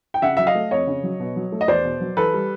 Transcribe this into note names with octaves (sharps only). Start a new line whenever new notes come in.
G5
C#3 E5 F#5
F#3 E5
D#5 F5
A3
F2 C#5 D#5
C#3
F#3
B2
F#3
A3
D#5
E2 C5 D5
B2
F#3
E3 A4 B4
G3